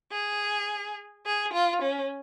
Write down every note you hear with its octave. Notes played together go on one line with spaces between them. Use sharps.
G#4
G#4
F4
C#4